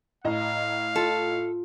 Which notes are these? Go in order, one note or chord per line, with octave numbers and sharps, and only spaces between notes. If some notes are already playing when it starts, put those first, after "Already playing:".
A2 D#5 F5 A#5
F4 A4